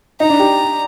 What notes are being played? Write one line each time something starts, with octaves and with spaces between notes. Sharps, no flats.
D#4 A#5
D4
G4